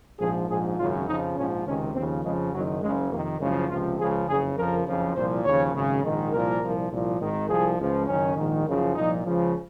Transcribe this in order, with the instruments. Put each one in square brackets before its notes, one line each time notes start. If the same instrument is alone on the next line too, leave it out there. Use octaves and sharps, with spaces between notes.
[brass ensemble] A#1 G#2 F3 G#4
A#1 G#2 F3 G#4
G#1 F#2 C#3 F4
F2 C#3 F3 D#4
A#1 G#2 F3 C#4
C#2 C3 D#3 C#4
D#2 C#3 F3 C4
F2 C#3 F3 G#3
F#1 F#2 D#3 F#3
F#1 F#2 C#3 G#3
F2 C3 D#3 A#3
F#1 F#2 C#3 F3 G#3
C#2 C3 F3 F4
C#2 C#3 F3 G#4
F#1 F2 C#3 G#4
F2 C#3 F3 A#4
F#1 F2 C#3 F3
C2 A#2 F3 C5
D#2 C#3 F3 C#5
G#1 F#2 C#3
A#1 G#2 D#3
C2 A#2 F3 A#4
C2 A#2 F3
C2 A#2 F3
G#1 G#2 D#3
C2 C3 F3 G#4
C#2 C#3 F3
F#1 F#2 D#3 C#4
A#1 G#2 D#3
F#1 F#2 C#3 F3
C2 A#2 F3 D#4
C#2 C#3 F3